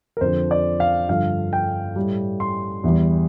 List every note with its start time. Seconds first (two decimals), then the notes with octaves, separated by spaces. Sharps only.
0.17 A#4
0.21 F2 D3 F3 C5
0.51 D5
0.80 F5
1.08 G2 D3 F3 F5
1.53 G5
1.96 A2 G3
2.40 C6
2.84 E2 E3 G3